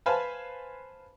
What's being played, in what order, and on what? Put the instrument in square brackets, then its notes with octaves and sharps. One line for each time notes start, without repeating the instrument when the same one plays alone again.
[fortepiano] B4 C5 F5 G#5 A5 B5